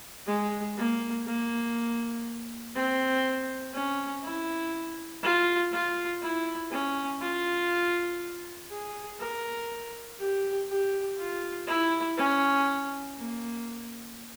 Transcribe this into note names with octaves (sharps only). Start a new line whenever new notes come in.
G#3
A#3
A#3
C4
C#4
E4
F4
F4
E4
C#4
F4
G#4
A#4
G4
G4
F4
E4
C#4
A#3